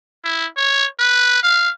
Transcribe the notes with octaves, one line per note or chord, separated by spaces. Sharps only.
E4
C#5
B4
F5